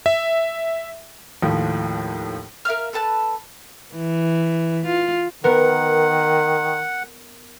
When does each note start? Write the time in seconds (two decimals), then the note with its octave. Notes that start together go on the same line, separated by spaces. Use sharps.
0.06 E5
1.42 D#2 A2 F3
2.65 A#4 E5 F5 F6
2.93 A4 B4 A5 F#6
3.95 E3
4.86 F4
5.44 D#3 B3 A#4 F#5